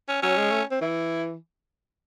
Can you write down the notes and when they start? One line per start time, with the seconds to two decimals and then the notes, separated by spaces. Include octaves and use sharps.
0.08 C#4
0.23 F#3 C#4
0.37 G#3
0.52 A3
0.71 C4
0.81 E3 E4